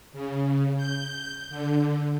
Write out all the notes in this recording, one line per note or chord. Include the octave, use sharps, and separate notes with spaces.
C#3
G6
D3